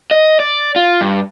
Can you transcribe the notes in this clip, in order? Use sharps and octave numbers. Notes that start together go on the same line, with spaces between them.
D#5
D5
F4
G2